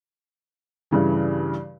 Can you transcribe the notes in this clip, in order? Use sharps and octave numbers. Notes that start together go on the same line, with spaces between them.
G2 C#3 E3